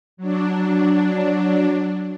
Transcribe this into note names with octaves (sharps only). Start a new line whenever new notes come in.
F#3 D4